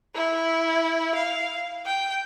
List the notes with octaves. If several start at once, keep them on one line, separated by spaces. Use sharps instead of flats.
E4
F5
G5